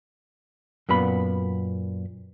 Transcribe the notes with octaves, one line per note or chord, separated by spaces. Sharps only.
F#2 A#2 B3 B5